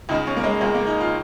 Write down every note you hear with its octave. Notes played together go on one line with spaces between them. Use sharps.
C#2 C#3 D#4
C#4
A#3
G#3
C#2 C#3 G#3
A#3
D#4
F4